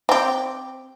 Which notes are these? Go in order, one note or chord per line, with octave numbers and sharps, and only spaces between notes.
C4 G4